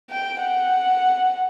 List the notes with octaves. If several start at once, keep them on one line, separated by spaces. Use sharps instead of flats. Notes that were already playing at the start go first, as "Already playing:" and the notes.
G5
F#5